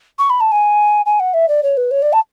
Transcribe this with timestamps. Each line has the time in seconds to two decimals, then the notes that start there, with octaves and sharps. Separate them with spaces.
0.18 C#6
0.29 B5
0.40 A5
0.51 G#5
1.05 G#5
1.19 F#5
1.33 E5
1.48 D5
1.63 C#5
1.77 B4
1.91 C#5
2.02 D5
2.12 A5